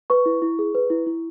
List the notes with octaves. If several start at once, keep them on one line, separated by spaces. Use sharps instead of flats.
B4 C#6
E4
E4
G#4
B4
E4
E4